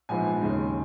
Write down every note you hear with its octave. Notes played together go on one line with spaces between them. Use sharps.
A#1 G#2 F3 B3 G#5
D#2 C#3 G#3 D#4